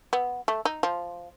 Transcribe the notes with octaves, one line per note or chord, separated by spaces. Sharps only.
B3
A3
D#4
F3